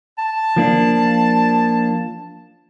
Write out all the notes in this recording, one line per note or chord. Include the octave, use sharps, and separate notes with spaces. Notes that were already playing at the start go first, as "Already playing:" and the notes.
A5
F3 A#3 D4